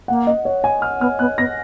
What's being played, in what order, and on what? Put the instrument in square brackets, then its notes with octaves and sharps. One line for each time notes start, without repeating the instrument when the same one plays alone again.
[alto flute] A#3 [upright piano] F#5
[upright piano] D#5
C#5
G#5
F6
[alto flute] B3 [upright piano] F6
[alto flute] B3 [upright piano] F#6
[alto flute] B3 [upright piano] A#6